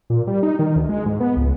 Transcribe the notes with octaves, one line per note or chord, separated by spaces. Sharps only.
A#2
G3
D#4
D#3
D2
G#3
G#2
B3
C#2